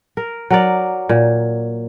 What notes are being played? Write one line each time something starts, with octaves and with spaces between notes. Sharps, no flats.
A#4
F#3 A#4 D5
A#2